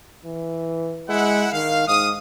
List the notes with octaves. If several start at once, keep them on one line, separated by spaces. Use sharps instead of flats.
E3
G#3 E4 F#5
D#3 F5
G#2 F5 D#6